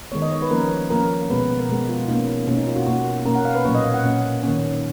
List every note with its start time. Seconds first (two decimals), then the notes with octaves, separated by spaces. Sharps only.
0.12 D#3 G#3 B3 C#5
0.22 D#5
0.32 C#5
0.42 B4
0.51 F3 A#3 C#4 A#4
0.90 F3 A#3 C#4 A#4
1.30 B2 G#3 B3 B4
1.59 A#4
1.69 B2 G#3 B3
1.89 F4
2.08 B2 A#3 C#4 D#4
2.47 B2 A#3 C#4
2.57 D#4
2.67 F4
2.76 F#4
2.86 B2 A#3 C#4 F#4
3.25 B2 A#3 C#4 A#4
3.35 F#5
3.45 F5
3.55 B4
3.65 A#2 F#3 A#3 C#4 C#5
3.75 D#5
3.84 F5
3.94 F#5
4.04 A#2 F#3 A#3 C#4
4.43 D#3 A#3 C#4